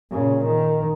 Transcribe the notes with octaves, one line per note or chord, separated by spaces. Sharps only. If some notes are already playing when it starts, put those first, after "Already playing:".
A#2 C#3
D#3